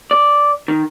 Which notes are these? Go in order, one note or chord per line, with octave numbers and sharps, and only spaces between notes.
D5
D#3